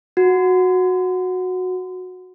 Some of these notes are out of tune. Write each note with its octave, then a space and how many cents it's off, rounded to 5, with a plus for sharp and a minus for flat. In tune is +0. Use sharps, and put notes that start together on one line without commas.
F#4 -10